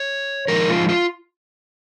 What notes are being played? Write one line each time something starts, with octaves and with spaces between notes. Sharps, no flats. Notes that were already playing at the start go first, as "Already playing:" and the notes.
Already playing: C#5
F3 G#3 D#4 A#4
F4
F4